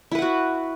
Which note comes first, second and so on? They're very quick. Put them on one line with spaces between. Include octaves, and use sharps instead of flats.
E4 B4 F#5 F#4